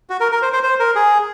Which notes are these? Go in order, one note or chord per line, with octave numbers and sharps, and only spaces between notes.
F#4
A#4
A#4
C5
C5
C5
A#4
G#4